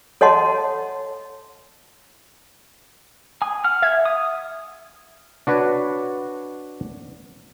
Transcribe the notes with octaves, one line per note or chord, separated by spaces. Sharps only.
A4 C#5 D#5 F#5 A5 C6
G#5 D#6
F#5 F6
E5 G#6
D#6
D4 F#4 B4 C#5